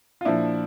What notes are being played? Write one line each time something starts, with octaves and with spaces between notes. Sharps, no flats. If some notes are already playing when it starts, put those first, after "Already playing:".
F4
A#2 F3 D4 E4